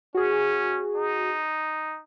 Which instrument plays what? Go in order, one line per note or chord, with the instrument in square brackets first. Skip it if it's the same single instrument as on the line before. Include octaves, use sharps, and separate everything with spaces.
[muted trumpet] C#4 [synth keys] F#4 G#4
[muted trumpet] D#4